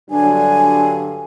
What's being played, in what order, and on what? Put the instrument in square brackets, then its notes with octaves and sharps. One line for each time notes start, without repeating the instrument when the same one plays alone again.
[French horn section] G2 D3 F#3 [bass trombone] D4 [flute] G#5